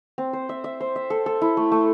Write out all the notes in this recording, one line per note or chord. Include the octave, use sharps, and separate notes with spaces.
C4
C5
E5
E5
C5
E5
A4
A4
E4
A3
A3